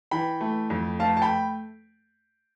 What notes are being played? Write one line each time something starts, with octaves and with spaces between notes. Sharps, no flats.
E3 G5 B5
A3
F2
A3 F5 A5
A5
G5 B5